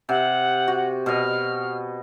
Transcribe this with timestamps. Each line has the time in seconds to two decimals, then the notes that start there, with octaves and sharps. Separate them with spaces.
0.09 C3 F#5
0.68 F#4
1.06 B2 D#5 F6